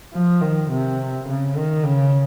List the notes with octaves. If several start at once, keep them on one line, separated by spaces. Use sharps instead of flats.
F3
D#3
C3
C#3
D#3
C#3